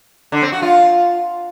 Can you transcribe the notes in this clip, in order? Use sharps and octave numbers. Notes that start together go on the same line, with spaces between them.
D3
C4
F#4
F4